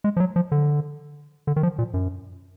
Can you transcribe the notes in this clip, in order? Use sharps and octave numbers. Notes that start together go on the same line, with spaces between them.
G#3
F3
F#3
F3
D3
D3
D#3
F3
A#2
F#2